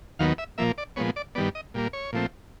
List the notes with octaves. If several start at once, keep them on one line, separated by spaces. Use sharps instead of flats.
D#2 D#3 F#3 B3 F5
E5
A#2 F3 A#3 E5
D5
A#2 F3 G#3 B3 C#5
D5
G2 D#3 G3 B3 D5
D#5
A#2 G3 A#3
C#5
A#2 F3 A3 C4